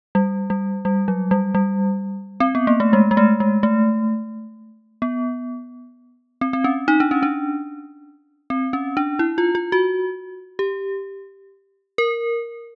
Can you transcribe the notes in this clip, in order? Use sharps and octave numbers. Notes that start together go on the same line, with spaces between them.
G3
G3
G3
F#3
G3
G3
C4
B3
A#3
A3
G#3
G#3
A3
G#3
A3
B3
C4
C4
C#4
D#4
D4
C#4
D4
C4
C#4
D4
E4
F4
F4
F#4
G4
A#4